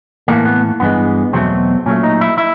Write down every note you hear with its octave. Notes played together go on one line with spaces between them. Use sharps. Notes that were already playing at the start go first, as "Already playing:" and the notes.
A2 E3 A3 A#3
B3
G2 E3 G#3 B3
E2 B2 F#3 A3 C4
A#2 F#3 A3 C#4
D#4
E4
E4